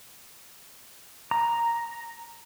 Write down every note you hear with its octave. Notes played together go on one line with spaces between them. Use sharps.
A#5